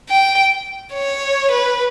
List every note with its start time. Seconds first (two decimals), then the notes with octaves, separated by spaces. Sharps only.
0.09 G5
0.94 C#5
1.52 B4